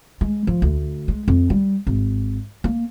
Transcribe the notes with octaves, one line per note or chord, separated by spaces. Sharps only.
G#3
F3
D2
G#3
F2
G3
G#1
A#3